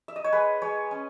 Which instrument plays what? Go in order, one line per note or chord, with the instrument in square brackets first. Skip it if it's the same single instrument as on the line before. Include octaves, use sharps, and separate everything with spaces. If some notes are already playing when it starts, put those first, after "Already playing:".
[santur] E5
D#5
C#5
G#3 B4
G#3 C#5
C#4